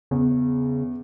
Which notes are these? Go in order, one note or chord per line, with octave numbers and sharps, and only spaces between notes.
E2 C#3